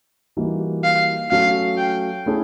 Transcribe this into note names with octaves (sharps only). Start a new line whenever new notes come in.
E3 G3 A#3 D#4 F#4
F5
F#3 A3 C#4 F5
G5
A3 C#4 E4 G#4